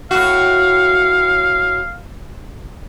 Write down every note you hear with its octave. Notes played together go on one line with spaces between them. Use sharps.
A2 F#4 F5